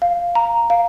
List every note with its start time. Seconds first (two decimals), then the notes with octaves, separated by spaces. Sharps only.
0.02 F5
0.35 A#5
0.70 F5